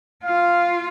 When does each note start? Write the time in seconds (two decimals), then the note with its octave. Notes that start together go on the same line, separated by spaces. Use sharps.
0.24 F4 F5